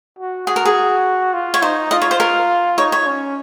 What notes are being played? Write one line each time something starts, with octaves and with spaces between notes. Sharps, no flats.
F#4
F#4 G#4
A#4
G#4
F4
C#5
D#4 C5
F4 D#5
C#5
C5
A#4
D#4 C#5
C#5
C#4